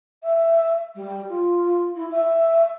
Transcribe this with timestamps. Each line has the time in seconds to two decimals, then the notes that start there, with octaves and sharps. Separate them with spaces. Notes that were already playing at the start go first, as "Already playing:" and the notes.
0.23 E5
0.95 G3
1.29 F4
1.95 E4
2.11 E5